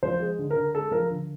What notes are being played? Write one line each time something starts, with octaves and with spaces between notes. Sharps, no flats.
F3 C5
G#3
D3
A#4
D3
G#3 A4
F3 A#4
D3